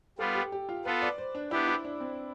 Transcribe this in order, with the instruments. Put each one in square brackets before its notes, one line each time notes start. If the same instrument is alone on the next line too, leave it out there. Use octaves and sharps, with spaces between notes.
[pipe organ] G3 B3 F4 [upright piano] A4
[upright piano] G4
G4
F4
[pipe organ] B3 F4 A4 [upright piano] B4
[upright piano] D5
C5
D4
[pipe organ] B3 D4 G4 [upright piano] E4
[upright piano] E4
D4
C4